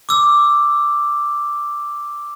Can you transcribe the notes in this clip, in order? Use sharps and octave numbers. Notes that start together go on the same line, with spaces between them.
D6 E6